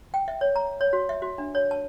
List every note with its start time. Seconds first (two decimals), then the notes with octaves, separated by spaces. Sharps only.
0.14 G5
0.28 E5
0.41 C#5
0.56 A#5
0.81 C#5
0.93 F#4
1.09 E5
1.22 F#4
1.38 D4
1.55 C#5
1.71 A5